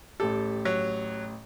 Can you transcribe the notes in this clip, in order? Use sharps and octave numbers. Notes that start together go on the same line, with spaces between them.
A1 G4 A4
F#3